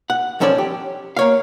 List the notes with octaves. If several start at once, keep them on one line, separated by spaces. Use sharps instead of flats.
F#5
B1 F3 C#4 A4 B4 D5
G4
A#3 C#5 F5